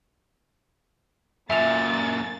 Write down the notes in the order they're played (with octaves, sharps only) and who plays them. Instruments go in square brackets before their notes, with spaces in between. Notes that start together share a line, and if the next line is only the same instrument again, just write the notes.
[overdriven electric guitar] F#2 A#2 [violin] A#3 A6 [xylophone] E5 F7